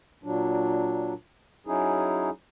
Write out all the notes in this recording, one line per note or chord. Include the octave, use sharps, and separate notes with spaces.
A#2 F#3 D4
F#3 C#4 D#4 E4 G#4